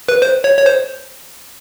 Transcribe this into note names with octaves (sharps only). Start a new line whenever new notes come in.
B4
C5
C#5
C#5
C5